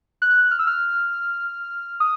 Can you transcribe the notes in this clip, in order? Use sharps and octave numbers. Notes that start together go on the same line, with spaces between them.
F#6
F6
E6
F6
D#6